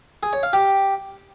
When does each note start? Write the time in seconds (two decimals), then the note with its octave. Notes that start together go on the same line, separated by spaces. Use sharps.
0.23 G#4
0.33 C#5
0.43 F5
0.53 G4